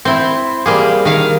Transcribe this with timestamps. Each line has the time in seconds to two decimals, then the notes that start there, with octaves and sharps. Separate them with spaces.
0.05 C4 E4
0.66 G3 A#3 G#4
1.05 D#3 F5